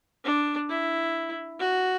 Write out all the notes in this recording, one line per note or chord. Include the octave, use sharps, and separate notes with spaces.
D4
E4
F#4